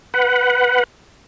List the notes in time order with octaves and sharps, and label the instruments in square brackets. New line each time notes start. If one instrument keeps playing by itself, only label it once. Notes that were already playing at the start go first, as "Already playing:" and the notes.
[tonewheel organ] B4 F#5